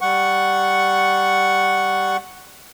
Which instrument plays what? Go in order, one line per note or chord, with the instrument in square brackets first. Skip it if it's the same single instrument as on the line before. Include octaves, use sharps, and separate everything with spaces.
[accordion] G3 F#5 C#6